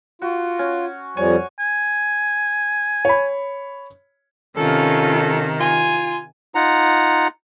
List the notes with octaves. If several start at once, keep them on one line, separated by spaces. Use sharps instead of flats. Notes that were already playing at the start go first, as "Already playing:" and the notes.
F4 F#4
C#4
F2 F3 G3 C#5 G#5
G#5
C#5 B5
C3 D#3 C#4 F4 A4
F4 G#5
D#4 F4 F#5 A#5